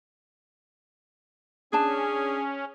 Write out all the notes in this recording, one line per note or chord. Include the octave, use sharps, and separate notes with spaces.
C#4 D4 G#4 A5